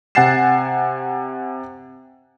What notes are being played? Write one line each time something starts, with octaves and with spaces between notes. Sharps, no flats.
C3 F#5 G#5 A6 C7 E7